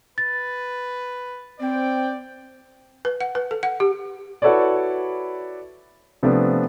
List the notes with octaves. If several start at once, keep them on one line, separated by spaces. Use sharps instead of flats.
B4 A6
C4 C5 D5 G5
B4
F#5
B4
A4
F#5
G4
E4 F#4 A4 B4 C#5 D5
C3 F3 A3 B3 D4